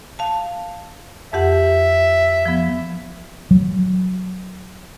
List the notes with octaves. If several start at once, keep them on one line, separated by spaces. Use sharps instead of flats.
F5 A5
F2 G4 E5 F#5
F3 B3
F#3